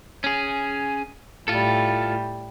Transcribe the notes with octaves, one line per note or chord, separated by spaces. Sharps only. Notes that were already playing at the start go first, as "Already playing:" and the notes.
C#4 G#4
A2 G3 F4 A4